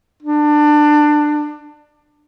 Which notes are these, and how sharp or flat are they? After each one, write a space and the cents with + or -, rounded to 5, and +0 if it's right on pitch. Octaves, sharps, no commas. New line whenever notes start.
D4 +20